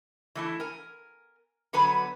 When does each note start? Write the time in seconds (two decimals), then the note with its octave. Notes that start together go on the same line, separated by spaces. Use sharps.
0.35 E3 A3 E4
0.60 A#4 G#5
1.73 D3 F#3 B3 B4 G#5